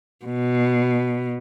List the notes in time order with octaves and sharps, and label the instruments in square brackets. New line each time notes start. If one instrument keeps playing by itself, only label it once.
[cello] B2